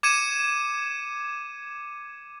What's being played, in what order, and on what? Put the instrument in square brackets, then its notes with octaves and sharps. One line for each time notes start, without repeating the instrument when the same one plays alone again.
[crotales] D6 G#6 C#7 D#7 E7